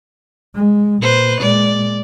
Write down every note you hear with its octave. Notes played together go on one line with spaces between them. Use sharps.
G#3
A#2 B4 C5
A#2 G#3 D5